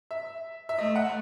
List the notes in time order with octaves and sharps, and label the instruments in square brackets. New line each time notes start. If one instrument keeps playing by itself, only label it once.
[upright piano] E5
E5
[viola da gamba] A3 [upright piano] D#5
[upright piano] F#5